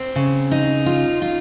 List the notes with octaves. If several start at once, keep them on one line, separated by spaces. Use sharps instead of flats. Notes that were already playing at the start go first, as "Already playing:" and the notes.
Already playing: C4
C#3
D#4
F4
F4